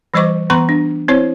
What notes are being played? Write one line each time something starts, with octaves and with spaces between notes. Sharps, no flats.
E3 G3 C5 D#5 C#6 D6
E3 B3 A#5 C6 C#6
D4
C4 E4 C5 C#5